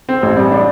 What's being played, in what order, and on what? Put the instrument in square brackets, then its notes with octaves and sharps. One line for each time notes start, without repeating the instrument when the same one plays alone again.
[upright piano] C4
A1
G3
D4